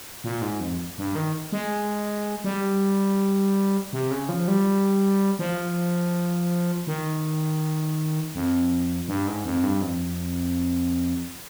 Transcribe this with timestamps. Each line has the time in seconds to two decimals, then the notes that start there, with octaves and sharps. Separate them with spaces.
0.24 A#2
0.42 G#2
0.60 F2
0.98 G2
1.15 D#3
1.52 G#3
2.44 G3
3.93 C3
4.11 C#3
4.29 F3
4.48 G3
5.39 F3
6.87 D#3
8.35 F2
9.08 G2
9.27 G#2
9.45 F2
9.63 G2
9.82 F2